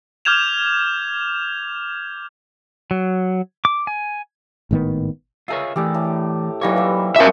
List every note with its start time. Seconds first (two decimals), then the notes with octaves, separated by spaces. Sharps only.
0.25 D6 F6 G6 G#6 E7 F7
2.91 F#3
3.65 D6
3.87 G#5
4.71 G#1 A2 D#3 B3
5.48 F4 G#4 A#4 C#5 D#5 E5
5.76 E3 A3 G4 G#4 D5
5.94 A2
6.61 E3 F#3 G3 A#3 D#4 C#5
6.76 C5 E5
7.16 F3 F#3 G#3 A#4 E5